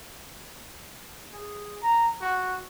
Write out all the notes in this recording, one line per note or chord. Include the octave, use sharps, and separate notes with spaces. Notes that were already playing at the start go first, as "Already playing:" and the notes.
G#4
A#5
F#4